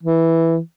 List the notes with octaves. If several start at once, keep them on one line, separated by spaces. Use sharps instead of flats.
E3